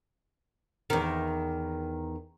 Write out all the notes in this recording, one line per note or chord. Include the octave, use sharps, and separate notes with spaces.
E2 D#3